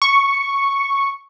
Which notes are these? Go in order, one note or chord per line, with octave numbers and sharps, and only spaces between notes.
C#6